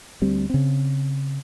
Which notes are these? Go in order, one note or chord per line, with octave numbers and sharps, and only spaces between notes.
D2 G3 C4
C#3 C4